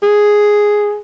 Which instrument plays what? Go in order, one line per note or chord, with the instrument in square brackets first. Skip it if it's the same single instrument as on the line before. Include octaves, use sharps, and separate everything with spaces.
[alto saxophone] G#4